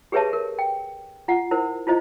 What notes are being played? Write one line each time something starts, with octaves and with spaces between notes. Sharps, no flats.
G4 G#4 B4 C#5 E5 A5
A#4
G5
F4 F#5
E4 A#4 C5
E4 F4 C5 D#5